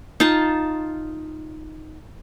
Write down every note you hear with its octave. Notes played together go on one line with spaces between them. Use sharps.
D#4 F4 A5